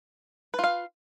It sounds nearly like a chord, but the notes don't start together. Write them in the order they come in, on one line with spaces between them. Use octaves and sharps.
B4 F4 F5